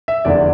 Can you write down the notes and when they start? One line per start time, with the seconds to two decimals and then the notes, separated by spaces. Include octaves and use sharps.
0.08 E5
0.25 F1 E2 D3 D5